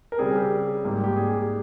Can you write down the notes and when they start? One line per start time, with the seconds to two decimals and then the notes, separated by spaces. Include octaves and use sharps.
0.12 A#4
0.18 C#3 G3 C4 G#4
0.35 G4
0.85 G#2 G3 A#3
1.04 G4
1.16 G#4